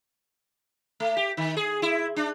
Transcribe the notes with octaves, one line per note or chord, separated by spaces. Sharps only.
A3
G4
D#3
G#4
E4
D4